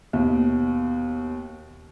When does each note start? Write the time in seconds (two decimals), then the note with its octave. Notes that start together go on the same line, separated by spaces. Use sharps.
0.13 D#2 B2